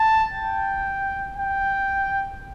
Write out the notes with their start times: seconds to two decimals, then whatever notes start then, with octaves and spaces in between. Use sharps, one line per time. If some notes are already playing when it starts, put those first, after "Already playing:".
Already playing: A5
0.33 G5
1.37 G5